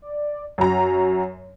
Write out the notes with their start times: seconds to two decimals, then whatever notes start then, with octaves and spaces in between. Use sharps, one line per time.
0.02 D5
0.58 F#2 F#4 A#5